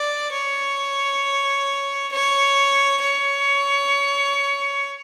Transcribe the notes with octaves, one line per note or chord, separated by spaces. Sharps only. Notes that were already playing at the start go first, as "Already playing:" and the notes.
Already playing: D5
C#5
C#5
C#5